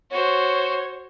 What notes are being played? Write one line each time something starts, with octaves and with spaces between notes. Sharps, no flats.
F#4 C5 C#5